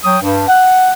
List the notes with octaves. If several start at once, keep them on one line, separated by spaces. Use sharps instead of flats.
F#3 C#5 G5 D#6
G2
F#5